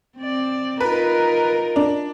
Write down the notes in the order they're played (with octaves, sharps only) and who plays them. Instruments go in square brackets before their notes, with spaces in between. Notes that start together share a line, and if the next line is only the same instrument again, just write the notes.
[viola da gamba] C4 D5
[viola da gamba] D#4 F4 A#4 [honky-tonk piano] B4
[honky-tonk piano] D4